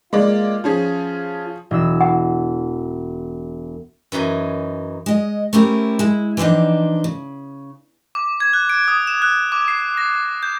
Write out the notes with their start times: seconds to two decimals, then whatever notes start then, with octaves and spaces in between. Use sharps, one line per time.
0.13 G#3 A#3 F4 D5
0.64 F3 C#4 G#4
1.71 E1 E6
2.01 F#5
4.12 F#2 E3 D#4 G#5
5.06 G#3 D#5
5.53 A3 C4 C#4 E4 G4 A#4
5.99 G#3 E4
6.37 E3 F3 C4 D4 D#4
7.04 C#3
8.15 D6
8.40 G#6
8.53 F#6
8.70 D7
8.88 D#6
9.07 E7
9.22 F#6
9.52 D6
9.68 C7
9.97 A#6
10.43 G6